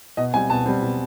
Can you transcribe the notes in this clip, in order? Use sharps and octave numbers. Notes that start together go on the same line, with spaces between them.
B2 D#5
G3 C4 G#5
B2 A5
G3 C4
B2